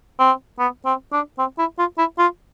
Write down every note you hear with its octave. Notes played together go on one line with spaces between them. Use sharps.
C4
B3
C4
D4
C4
E4
F4
E4
F4